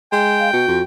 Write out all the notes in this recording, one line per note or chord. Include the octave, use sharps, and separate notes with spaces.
G#3 G5
F5
B2 F#4
F2